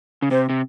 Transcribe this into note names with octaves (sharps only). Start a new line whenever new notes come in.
C#3
C3 C5
C3